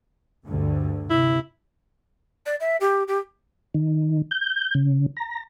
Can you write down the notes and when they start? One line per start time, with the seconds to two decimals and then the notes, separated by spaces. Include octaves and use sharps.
0.45 D2 G2 D3
1.10 C3 E4
2.46 D5
2.60 E5
2.81 G4
3.08 G4
3.74 D#3
4.31 G6
4.75 C#3
5.17 A#5